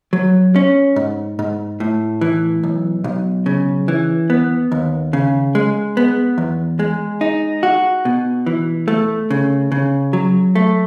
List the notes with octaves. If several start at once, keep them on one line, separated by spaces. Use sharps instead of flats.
F#3
C#4
G#2
G#2
A2
E3
B1
B1
C#3
E3
B3
D#2
C#3
G#3
B3
E2
G#3
D#4
F#4
B2
E3
A3
C#3
C#3
F#3
A3